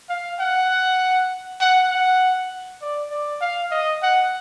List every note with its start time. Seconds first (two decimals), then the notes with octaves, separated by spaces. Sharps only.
0.09 F5
0.40 F#5
1.61 F#5
1.90 F#5
2.82 D5
3.11 D5
3.41 F5
3.71 D#5
4.02 F#5